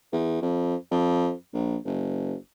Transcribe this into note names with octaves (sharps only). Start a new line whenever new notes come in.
E2
F2
F2
A#1
F#1